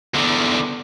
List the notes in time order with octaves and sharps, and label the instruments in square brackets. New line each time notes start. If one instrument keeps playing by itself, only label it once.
[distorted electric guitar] E2 D3